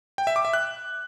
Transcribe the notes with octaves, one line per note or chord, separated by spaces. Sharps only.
G5
E5
D6
E5
F#6